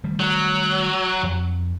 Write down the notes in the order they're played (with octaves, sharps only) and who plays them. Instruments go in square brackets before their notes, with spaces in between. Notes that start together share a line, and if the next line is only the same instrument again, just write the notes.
[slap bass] D#3 G3 A3
[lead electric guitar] F#3
[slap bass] F2